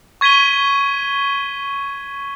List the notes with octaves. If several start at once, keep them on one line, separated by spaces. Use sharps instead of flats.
C#6 G#6 B6 D#7 G7